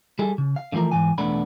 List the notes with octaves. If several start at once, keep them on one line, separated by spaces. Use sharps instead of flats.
G3 G#4 A4
C#3
F5
D3 E3 F3 A3 A#4
G#2 E3 G#5
B1 E2 A3 B3 D4 B5